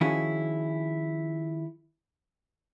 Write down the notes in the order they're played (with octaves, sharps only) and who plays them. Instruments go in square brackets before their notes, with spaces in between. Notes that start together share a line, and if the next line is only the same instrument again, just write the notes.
[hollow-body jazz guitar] D#3 F3 C#4 E4 F#4 G#4